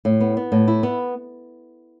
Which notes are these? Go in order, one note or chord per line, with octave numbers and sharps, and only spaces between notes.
A2
B3
B3
A2
E4
B3